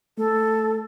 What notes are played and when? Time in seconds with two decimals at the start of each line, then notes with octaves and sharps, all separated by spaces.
0.18 A3 A4